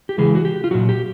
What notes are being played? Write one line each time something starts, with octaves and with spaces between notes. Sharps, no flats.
G4
C#3 E3 G#3 G#4
F#4
G4
F4
A#2 F#3 F#4
G4